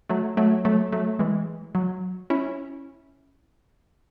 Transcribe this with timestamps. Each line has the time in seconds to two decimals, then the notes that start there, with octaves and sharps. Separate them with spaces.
0.09 F#3 A3
0.37 F#3 A3
0.65 F#3 A3
0.92 F#3 A3
1.19 E3 G#3
1.75 F#3
2.30 C#4 E4